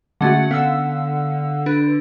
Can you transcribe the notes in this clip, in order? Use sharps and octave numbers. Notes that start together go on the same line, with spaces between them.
D3 G#3 A3 C#4 F#4 F#5 A6
D3 B3 F5 F#5 E6
D4 B4